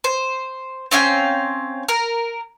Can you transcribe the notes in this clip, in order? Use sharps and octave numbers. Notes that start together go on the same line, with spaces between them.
C5
C4 C#4 F5 G5
A#4